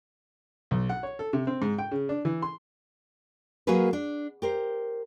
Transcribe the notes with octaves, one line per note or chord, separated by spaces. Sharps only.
B1
F#5
C#5
A4
C3
C4
G#2
G5
C#3
D4
E3
C6
F#3 A#3 F#4 G#4 A#4 B4
D4
G4 A#4 C5